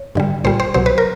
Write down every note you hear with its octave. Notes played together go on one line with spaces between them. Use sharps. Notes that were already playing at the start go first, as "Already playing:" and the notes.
Already playing: C#5
G2 D3 G3
B1 A#2 G3 C5
C5
C2 B2 F#3 C5
B4
A#4